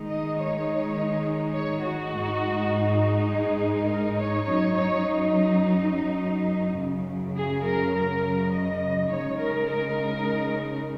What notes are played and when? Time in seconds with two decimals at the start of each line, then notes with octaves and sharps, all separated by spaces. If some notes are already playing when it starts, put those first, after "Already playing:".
Already playing: D#3 G#3 D#4
0.08 D#5
0.37 C#5
1.54 C#5
1.82 F#4
2.12 G#2 G#3 D#4
3.28 G#4
3.86 A#4
4.15 C#5
4.44 F#2 F#3 D#4 C#5
4.73 C#5
6.76 F#2 C#3 F#3
7.35 G#4
7.63 A#4
7.92 A#4
8.51 D#5
9.09 C#3 G#3 D#4 C#5
9.37 A#4
9.67 A#4